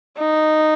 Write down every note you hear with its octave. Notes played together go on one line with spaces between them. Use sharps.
D#4